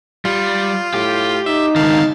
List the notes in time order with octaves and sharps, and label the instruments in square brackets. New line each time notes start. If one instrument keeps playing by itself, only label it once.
[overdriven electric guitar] G3 [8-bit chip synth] F4
[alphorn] A2 [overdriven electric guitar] G4
[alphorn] D#4 [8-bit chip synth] E5
[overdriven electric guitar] C#2 D#3 [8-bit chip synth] F5 A5